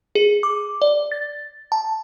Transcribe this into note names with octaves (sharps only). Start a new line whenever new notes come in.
G#4
D6
D5
A6
A5